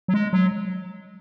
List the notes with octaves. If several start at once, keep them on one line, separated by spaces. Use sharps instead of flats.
F#3
G#3
F#3